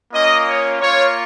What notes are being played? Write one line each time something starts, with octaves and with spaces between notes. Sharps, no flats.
A#3 C#4 F4 D#5
C#5
A#3 F4 C#5